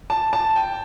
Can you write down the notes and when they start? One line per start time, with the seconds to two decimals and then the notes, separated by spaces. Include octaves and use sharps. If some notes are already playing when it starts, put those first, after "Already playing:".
0.10 A5
0.33 A5
0.56 G5